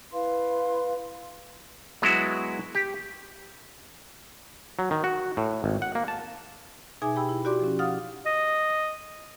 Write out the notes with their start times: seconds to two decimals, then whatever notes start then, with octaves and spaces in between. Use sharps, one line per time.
0.13 E4 B4 F5 C6
2.02 F#3 G#3 B3 E4 F#4
2.75 G4
4.79 F#3
4.91 D#3
5.04 F#4
5.37 A2
5.64 G#1
5.82 F#5
5.95 A#3
6.08 A5
7.02 B2 D#4 G#4 E5 G#5 D6
7.15 G4 G5 B5 E6
7.29 E4
7.45 F#4 G4 D5 C6 D6
7.60 F3 C#4
7.79 F5 F#5 D#6 F6 A6
8.26 D#5